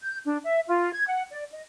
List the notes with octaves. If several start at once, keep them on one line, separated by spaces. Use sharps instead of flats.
G6
D4
E5
F4
G#6
F#5
D5
D#5